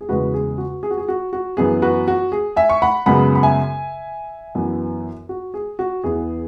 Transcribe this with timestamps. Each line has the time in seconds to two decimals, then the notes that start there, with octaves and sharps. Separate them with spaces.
0.01 G#4
0.09 E2 C#3 G#3 F#4 B4
0.34 G#4
0.58 F#4
0.83 G#4
0.91 F#4
0.98 G#4
1.08 F#4
1.33 F#4
1.57 F#2 E3 B3 G#4
1.82 F#4 B4
2.08 F#4
2.32 G#4
2.56 E5 G#5
2.69 C#6
2.82 F#5 B5
3.06 F#2 C#3 G#3 B3 F#5 B5
3.35 B5
3.43 E5 G#5
4.55 F#2 E3 B3
5.29 F#4
5.54 G#4
5.79 F#4
6.04 E2 E3 B3 G#4